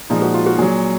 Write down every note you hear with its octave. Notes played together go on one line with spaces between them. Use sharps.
A#2 F3 G#3 D#4
F#4
F4
F#4
A#2 F#3 G#4